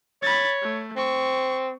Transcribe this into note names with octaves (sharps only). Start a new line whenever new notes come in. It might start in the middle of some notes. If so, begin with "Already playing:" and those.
C#5 B5 A6
A3
C4 C#6